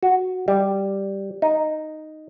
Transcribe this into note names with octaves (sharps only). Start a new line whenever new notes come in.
F#4
G3
D#4